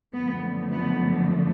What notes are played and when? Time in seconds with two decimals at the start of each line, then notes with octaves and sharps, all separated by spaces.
0.14 F#2 D3 F3 A3 B3
0.72 B3